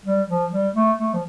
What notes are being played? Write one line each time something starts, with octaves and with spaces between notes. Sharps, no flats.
G3
F3
G3
A3
A3
F3